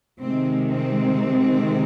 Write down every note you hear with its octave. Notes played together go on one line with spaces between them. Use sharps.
C3 D#3 G#3 C4
C4